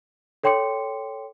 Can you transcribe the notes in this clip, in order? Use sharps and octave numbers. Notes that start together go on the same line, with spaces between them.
A4 C#5 G5 C6 D6 C#7